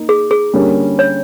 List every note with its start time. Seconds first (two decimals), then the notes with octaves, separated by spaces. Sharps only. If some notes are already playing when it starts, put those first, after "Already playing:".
Already playing: A#3 D#4
0.09 G#4
0.31 G#4
0.53 D3 G3 A#3 C#4
0.99 C#5